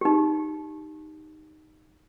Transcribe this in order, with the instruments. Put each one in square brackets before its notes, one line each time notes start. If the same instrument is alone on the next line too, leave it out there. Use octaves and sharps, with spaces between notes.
[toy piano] D#4 G4